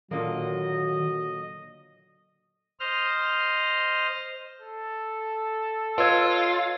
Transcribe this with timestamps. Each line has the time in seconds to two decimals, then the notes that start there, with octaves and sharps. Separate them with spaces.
0.11 A#2 D3 D#3 F#3 A#3 D#5
2.80 C5 D#5 F6
4.61 A4
5.98 F4 B4 C#5 D#5 E6 G#6